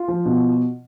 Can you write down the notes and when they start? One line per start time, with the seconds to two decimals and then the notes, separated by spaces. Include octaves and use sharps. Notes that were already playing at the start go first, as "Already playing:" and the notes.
Already playing: F4
0.08 F3
0.26 B2